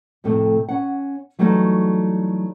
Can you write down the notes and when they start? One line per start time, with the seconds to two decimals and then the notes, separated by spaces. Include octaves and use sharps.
0.24 F2 A2 C3 A3
0.69 C#4 F#5
1.39 E3 F#3 G3 A3 D#4 F#4